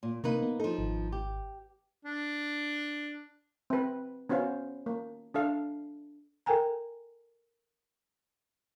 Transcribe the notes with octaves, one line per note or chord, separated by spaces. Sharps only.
A#2
C3 A#3 D#4 B4
B3
F3 D#4 A4
G#1
G4
D4
C4 B4
B3 C#4 F#4 C5 F5
A#3
D4 A4 F5
A4 A#4 G5 G#5 A#5